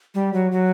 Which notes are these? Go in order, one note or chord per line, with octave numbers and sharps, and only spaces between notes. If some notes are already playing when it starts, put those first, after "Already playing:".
G3
F#3
F#3